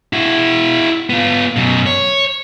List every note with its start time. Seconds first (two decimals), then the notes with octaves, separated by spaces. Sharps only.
0.13 E4 F#4
1.10 B3 F4
1.56 F#2 B2
1.86 C#5